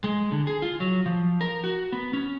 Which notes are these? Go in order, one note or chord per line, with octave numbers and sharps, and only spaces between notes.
G#3
D3
G#4
F4
F#3
F3
A#4
F#4
B3
C#4